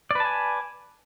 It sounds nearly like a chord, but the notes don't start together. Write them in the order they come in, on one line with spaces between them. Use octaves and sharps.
D5 B4 A5 G#5